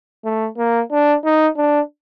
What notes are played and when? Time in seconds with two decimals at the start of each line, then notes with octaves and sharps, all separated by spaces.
0.25 A3
0.58 A#3
0.92 D4
1.25 D#4
1.57 D4